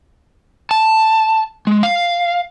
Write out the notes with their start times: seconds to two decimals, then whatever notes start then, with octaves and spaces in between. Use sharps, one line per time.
0.71 A5
1.67 G#3
1.83 F5